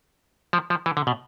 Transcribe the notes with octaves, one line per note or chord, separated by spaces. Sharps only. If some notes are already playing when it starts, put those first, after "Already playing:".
F3
F3
E3
D3
B2